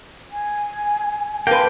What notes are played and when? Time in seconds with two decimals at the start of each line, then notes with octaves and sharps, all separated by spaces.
0.31 G#5
1.47 A#3 B4 G5 A5